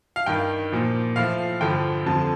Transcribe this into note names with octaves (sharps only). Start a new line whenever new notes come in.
F5
G2 D#3 G5
A#2 F3
A2 F3 F5
G2 D3 F3 G5
F2 D3 F3 A5